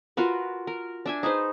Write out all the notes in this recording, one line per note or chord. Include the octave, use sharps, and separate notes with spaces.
F4 F#4 A#4 B4
A#4
D4 E5 G#5
D#4 G#4 B4 C5